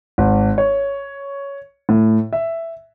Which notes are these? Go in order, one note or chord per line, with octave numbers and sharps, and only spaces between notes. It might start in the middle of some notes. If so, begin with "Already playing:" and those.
G#1
C#5
A2
E5